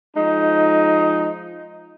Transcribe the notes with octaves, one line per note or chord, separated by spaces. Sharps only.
F3 G#3 D#4